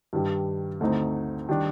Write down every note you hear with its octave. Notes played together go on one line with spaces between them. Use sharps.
G2 D#3 G3
D2 D3 A3 C4 D#4
D#3 G3 D4